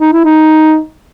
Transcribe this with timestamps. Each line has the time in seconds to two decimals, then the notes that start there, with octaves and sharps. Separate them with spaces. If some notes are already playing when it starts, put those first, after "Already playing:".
0.01 D#4
0.12 E4
0.24 D#4